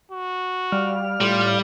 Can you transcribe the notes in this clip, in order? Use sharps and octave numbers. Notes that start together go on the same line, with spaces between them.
F#4
G3 D5 F5 F6
A2 G3 F4